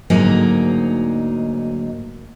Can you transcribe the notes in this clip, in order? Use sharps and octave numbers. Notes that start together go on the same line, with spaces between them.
D2 G#2 F#3 A#3 D#4